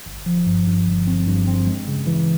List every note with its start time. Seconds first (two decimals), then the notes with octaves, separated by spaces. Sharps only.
0.06 G1
0.26 F3
0.46 G2
0.67 G2
0.87 G1
1.07 C4
1.27 G2
1.47 C4
1.67 G#3
1.88 C#3
2.07 E3